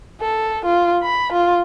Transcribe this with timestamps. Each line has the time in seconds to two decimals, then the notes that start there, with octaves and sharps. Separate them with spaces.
0.21 A4
0.66 F4
1.03 B5
1.33 F4